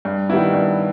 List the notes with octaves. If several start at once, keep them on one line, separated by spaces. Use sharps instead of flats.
G2
D#3 G3 B3 E4
G2